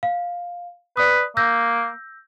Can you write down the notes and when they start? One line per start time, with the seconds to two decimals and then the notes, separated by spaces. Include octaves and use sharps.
0.03 F5
0.97 B4 D5 D#6
1.37 A#3 E6 G6 A#6